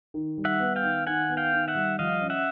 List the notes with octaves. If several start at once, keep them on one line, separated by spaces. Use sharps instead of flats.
D#3
G3
E5 F#5
B3
F5 G5
D#3
D#3 F#5 G#5
B3
F5 G5
D#3
E5 F#5
G3
F3 D#5 F5
C#4
E5 F#5